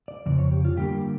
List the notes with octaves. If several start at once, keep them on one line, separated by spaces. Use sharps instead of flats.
D5
F2 C#3 D5
C#5
G4
F4
G2 D3 G3 A#3 G4